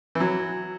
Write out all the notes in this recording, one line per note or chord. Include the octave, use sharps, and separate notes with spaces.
E3
F#3